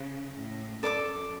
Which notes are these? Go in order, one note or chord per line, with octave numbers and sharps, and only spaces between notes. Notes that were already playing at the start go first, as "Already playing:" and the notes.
Already playing: C#3
A2
F#2 A4 D5 A5 D6